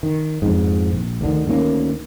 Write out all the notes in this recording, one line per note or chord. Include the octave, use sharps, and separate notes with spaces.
D#3
F2 G#2
A#1
D2 D3 D#3
D2 D#3 A#3 C#4